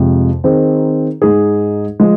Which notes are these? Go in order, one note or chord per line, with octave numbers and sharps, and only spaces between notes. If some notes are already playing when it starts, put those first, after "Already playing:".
Already playing: F2 C3 G#3
D#3 C4 D#4 G#4
G#2 G#3 D#4 G#4
F3 G#3